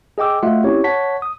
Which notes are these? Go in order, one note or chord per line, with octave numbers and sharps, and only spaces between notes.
G#4 D#5 G5 D6 E6
A3 F4 F#4 D#5 E5 F#5
C4 C#4 E4 G4 C#5
C#5 F#5 A5 B6
D#6